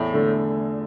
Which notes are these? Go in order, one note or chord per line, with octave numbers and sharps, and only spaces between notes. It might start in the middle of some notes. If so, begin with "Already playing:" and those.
Already playing: E2 A2
D3 A3